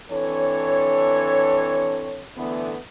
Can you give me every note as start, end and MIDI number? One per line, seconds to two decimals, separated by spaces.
0.11 2.26 52
0.11 2.26 60
0.11 2.26 62
0.11 2.26 69
0.11 2.26 73
2.37 2.74 50
2.37 2.74 52
2.37 2.74 57
2.37 2.74 59